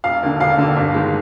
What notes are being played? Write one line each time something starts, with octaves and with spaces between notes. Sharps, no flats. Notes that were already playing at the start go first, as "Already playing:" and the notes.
E1 F5
D#2 D3
E1 F5
D#2 D3
G1
D#3 G#3